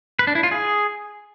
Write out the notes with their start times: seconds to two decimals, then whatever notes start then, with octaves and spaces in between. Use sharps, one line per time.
0.19 B4
0.27 D4
0.35 E4
0.43 F4
0.51 G#4